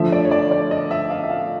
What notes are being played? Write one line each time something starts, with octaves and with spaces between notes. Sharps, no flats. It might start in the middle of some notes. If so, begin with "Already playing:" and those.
Already playing: D3 F3 A3 E5
D5
C#5
D5
D5
D#5
E5
F5
E5
F5